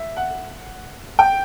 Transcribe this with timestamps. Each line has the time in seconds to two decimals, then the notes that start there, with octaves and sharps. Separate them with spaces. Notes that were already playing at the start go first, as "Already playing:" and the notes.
Already playing: E5
0.17 F#5
1.19 G5